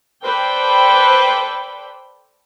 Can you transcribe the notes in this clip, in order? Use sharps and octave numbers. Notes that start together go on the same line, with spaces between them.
A4 B4 C5 D5 G5